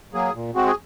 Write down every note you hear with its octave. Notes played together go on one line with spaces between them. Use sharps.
F#3 A#3 G#4
A#2
G#3 C4 F#4
G#4